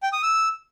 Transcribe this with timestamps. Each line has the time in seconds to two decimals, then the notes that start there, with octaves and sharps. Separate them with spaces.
0.03 G5
0.13 D#6
0.23 E6